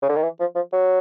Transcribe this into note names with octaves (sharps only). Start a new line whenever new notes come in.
C#3
D3
D#3
E3
F3
F3
F#3